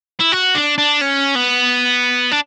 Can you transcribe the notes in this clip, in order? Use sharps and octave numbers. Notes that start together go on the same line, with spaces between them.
E4
F#4
D4
D4
C#4
B3
D4